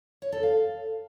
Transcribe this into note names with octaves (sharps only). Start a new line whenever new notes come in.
C#5
A4
F5